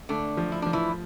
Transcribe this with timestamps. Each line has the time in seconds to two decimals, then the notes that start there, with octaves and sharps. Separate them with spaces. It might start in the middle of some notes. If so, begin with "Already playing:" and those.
0.09 D3 A3 D4
0.37 F3
0.52 E4
0.62 F3 D4
0.73 E3 E4